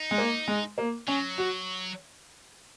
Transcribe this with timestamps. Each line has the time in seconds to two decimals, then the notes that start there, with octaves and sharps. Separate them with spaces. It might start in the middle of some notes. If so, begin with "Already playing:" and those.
Already playing: D#4
0.11 G#3
0.18 A#3
0.48 G#3
0.78 A#3
1.07 F#3 C#4
1.38 F#4